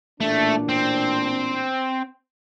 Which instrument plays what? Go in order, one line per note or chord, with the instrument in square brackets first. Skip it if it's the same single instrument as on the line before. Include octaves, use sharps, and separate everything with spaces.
[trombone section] A1 A#2 D4 [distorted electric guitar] A3
[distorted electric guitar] C4